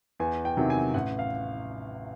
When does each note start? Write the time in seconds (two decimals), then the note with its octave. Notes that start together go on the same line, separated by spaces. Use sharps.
0.20 E2 G#5
0.45 G5
0.57 C3 D#3 F#3
0.70 G#5
0.94 A1 F#5
1.19 F5